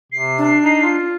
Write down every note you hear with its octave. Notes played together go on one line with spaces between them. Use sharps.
C3 C7
D4
D#4
F4